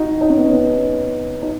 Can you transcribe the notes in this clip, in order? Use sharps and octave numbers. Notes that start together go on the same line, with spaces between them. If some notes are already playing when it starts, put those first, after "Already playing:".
Already playing: D#4 F#4
D#4
C#4
B3
C#4
B3
D#4